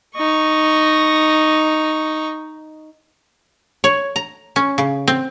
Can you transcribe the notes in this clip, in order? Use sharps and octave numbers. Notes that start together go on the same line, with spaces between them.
D#4 C#6
C#5
A#5
C#4
C#3
C4